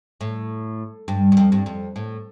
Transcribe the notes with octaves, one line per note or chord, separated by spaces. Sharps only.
A2
G2
G2
F2
G2
F2
A2